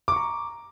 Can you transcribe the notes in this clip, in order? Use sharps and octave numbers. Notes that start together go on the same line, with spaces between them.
A#5 C#6 D6